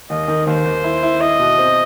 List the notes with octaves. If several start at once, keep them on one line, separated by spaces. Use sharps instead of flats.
D#2 D#5
D#3
D#2 C5
D#2
E4
E4
E4 D#5
B2
C4